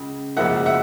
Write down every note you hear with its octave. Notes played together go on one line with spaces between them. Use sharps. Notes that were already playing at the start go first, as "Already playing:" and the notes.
Already playing: C#2 C#3
C#2 C#3 F3 A#3 E5 F#5
E5 F#5